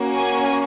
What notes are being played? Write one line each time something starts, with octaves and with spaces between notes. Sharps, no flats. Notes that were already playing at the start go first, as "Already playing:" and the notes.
Already playing: A#3 C#4 F#4
G#5